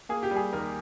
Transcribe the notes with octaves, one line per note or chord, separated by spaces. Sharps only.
A#3 G#4
G4
G3
G#4
D#2 A#4